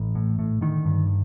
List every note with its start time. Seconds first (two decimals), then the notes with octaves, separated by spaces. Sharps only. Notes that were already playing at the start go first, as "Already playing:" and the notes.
Already playing: A1
0.15 A2
0.39 A2
0.61 D3 D#3
0.85 G2